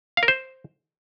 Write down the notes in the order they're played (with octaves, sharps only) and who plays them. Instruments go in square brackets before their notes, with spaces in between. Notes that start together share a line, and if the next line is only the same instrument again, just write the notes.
[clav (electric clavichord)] F5
A#4
C5